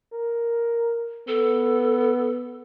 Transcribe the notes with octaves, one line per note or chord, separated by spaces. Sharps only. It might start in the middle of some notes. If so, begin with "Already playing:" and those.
A#4
B3 A4